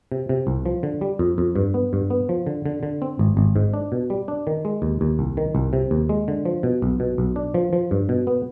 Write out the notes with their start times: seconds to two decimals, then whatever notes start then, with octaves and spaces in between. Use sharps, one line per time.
0.12 C3
0.29 C3
0.47 C2
0.66 F3
0.83 D3
1.01 G3
1.19 F2
1.38 F2
1.56 G2
1.74 B3
1.93 G2
2.10 B3
2.29 F3
2.47 D3
2.66 D3
2.83 D3
3.02 C4
3.19 G#1
3.37 G#1
3.56 G#2
3.74 D4
3.92 B2
4.10 G3
4.28 D4
4.47 D#3
4.65 G#3
4.82 D#2
5.01 D#2
5.19 C2
5.37 D#3
5.55 C2
5.73 C3
5.91 D#2
6.09 G#3
6.28 D3
6.45 F3
6.63 B2
6.82 B1
7.00 B2
7.18 B1
7.36 D4
7.54 F3
7.73 F3
7.91 G2
8.09 B2
8.27 B3